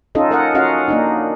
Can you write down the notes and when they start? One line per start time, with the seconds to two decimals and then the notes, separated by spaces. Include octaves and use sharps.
0.15 C#4 D#4 F4 A4 D#5
0.31 A#4 D#5 F#5
0.54 C#4 F4 F#4 D#5 F5 F#5
0.88 A#3 D4 D#4